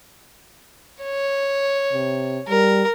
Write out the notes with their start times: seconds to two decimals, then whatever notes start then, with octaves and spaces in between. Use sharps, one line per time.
1.02 C#5
1.93 C3
2.48 G3 A#4